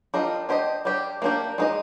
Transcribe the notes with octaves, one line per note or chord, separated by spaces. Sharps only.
G3 D4 F4 A#4 D#5
D4 G4 C5 D#5
G3 D4 G4
A#3 D4 G4 A#4
G#3 D#4 A#4 D#5